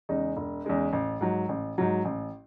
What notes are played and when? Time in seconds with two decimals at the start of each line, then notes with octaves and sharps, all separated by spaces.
0.09 E2 C#3 G#3 D#4
0.37 E1
0.65 E2 C#3 G#3 D#4
0.93 A1
1.21 G#2 F#3
1.49 A1
1.78 G#2 F#3
2.05 A1